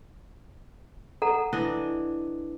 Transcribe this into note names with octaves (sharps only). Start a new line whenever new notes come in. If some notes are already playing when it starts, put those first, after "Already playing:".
A4 F#5 A#5
E3 D4 D#5